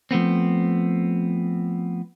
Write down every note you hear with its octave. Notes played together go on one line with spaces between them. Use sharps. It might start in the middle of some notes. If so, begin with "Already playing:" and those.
F3 A3 B3 C4